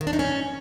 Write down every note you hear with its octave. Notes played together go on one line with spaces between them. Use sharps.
D#3
D4
D#4
C#4